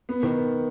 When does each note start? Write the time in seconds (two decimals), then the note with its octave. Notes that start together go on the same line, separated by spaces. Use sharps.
0.09 B3
0.23 D#3